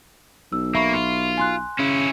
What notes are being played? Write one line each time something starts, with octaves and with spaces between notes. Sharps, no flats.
B1 E6
A#3 E5 B5 C#6
F4
G#5 C6 F#6
C#3 C#4 E4